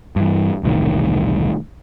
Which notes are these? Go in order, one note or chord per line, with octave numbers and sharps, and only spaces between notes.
G2 E3
E1 C2 A2 D#3